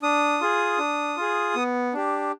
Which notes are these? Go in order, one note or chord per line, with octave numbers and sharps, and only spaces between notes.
D4 D#6
F4 G#4
D4
F4 G#4
B3
D4 G4